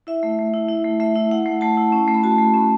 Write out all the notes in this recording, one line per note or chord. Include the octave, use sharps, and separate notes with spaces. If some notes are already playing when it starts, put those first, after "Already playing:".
E4 E5
A3
A3
E4
E4
A3
A3 E5
E4
E4 F#5
A3
A3 A5
E4
C#4
A3
B5
F#4 A5
A3
C#4